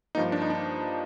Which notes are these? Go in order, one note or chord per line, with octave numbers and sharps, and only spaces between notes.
G2 F3 A#3 D#4
D4
D#4
D4